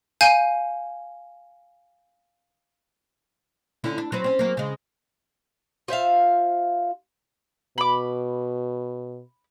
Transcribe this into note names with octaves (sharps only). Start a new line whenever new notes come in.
F5 G#5 G6 D#7
D3 C#4 E4
D4
F#3 C4 B4
C4 C#4
F#3 A#3
C#3 G#3
F4 C5 E5 F5
B2 B5 D6